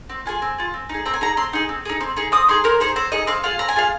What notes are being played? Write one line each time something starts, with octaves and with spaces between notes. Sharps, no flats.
C4
F4 G#4 G#5
C4
F4 G#4
C4
D#4 G#4
C4 A#5
G#5
D#4 G#4 A#5
C4 C6
D#4 G#4
C4
D#4 G#4
C4
D#4 G#4
C4 D#6
D#4 G#4 C6
C4 A#4
D#4 G#4 C5
C4 C5
D#4 G#4 D#5
C4 F5
F4 G#4 F5
C4 A#5
G#5
F4 G#4 F5